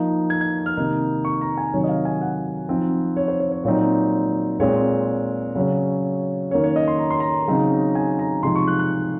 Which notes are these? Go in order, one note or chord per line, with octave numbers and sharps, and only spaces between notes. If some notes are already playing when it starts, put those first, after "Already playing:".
Already playing: F3 A#3 D#4
G#6
G#6
F6
C3 D#3 A#3 D#4
C#6
A#5
G#5
C3 D#3 F#3 C#5
D#5
F5
G#5
F#5
F3 C4 D#4
C#5
C5
C#5
C#5
A#2 F#3 C4 D#4 C#5
A#2 G#3 C4 C#5
C#3 F#3 C#4
D#3 A#3 C#4 C#5
C#5
D#5
C6
A#5
C6
A#5
C#3 F#3 C4 D#4
G#5
A#5
C3 F3 G#3 D#4 C6
C#6
F#6
F#6